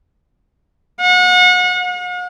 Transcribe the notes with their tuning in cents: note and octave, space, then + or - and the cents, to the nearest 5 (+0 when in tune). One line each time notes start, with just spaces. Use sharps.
F#5 -35
F#5 -45